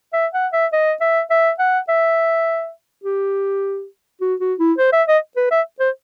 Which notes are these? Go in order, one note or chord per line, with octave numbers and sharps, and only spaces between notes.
E5
F#5
E5
D#5
E5
E5
F#5
E5
G4
F#4
F#4
E4
C5
E5
D#5
B4
E5
C5